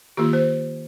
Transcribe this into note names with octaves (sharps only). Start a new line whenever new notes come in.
D#3 A#3 F4 G4
C5